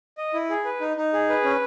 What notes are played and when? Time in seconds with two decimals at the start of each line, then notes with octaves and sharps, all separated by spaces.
0.18 D#5
0.34 E4
0.50 G#4
0.65 B4
0.81 D#4
0.97 D#4
1.13 G#4
1.29 B4
1.44 C#4